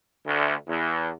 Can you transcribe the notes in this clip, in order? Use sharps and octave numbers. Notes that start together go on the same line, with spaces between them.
D2
E2